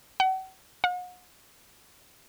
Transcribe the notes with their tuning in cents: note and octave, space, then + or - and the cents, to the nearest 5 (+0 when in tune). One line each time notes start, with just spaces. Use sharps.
F#5 +40
F#5 -40